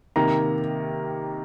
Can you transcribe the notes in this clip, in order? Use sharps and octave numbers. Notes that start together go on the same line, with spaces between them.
C3 D#3 A#3 A#5